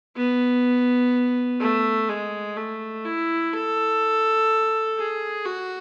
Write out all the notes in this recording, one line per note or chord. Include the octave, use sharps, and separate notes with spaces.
B3
A3
G#3
A3
E4
A4
G#4
F#4